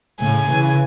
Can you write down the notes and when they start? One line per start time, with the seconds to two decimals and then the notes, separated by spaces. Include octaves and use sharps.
0.20 A2 C#3 G#5
0.50 C#3 E3